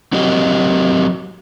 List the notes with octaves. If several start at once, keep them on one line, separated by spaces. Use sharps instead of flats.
F#3 C4 F#4 G4 A#4 D#5